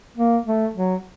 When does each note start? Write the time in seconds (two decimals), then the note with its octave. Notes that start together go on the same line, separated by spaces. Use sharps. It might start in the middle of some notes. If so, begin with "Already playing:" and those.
0.17 A#3
0.46 A3
0.75 F#3